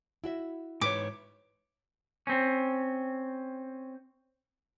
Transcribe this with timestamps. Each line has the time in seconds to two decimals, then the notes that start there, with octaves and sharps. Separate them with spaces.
0.24 E4 F#4 E5
0.81 G#2 B4 C#5 D6
2.27 C4 C#4